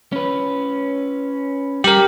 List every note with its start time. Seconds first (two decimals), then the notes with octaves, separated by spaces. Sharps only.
0.12 C#4 B4
1.84 G3 G4 A#4